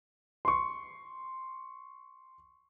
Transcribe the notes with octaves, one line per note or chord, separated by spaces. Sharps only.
C6 C#6